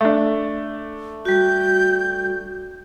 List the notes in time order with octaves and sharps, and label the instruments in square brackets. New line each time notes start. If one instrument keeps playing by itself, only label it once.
[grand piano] A3 D4
[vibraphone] G3 F#4 [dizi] G6